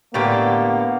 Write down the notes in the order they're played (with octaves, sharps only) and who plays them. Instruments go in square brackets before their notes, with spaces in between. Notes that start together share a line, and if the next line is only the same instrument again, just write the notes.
[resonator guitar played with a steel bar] A2 D3 G4 [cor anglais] A#3 [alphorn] B3 [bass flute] F#5